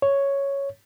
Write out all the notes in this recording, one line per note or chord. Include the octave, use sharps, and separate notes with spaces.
C#5